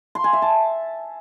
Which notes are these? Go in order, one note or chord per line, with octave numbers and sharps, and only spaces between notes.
C6
G#5
E5
A5